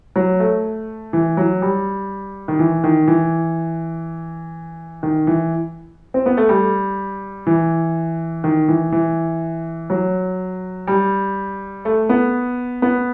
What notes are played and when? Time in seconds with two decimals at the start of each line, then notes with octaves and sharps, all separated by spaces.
0.16 F#3
0.40 A3
1.13 E3
1.37 F#3
1.62 G3
2.48 D#3
2.59 E3
2.84 D#3
3.07 E3
5.03 D#3
5.27 E3
6.14 C4
6.26 B3
6.37 A3
6.49 G3
7.47 E3
8.44 D#3
8.68 E3
8.92 E3
9.90 F#3
10.87 G3
11.85 A3
12.09 B3
12.82 B3